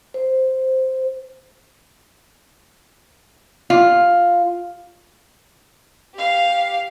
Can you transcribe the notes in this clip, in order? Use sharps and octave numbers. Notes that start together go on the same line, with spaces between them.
C5
F4
G4 F5